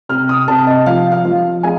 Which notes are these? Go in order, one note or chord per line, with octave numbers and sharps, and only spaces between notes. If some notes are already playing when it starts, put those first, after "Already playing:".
C3 F6
D#6
C3 A5
D#5
F3 F5
F5
F3
G#3 G#5